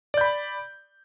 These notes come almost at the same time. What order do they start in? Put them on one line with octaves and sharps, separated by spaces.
D5 G6 B5